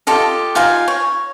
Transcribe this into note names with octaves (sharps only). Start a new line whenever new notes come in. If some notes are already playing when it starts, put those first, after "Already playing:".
F4 G4 A4 D#5
D#4 F4 F5 G#5
C#5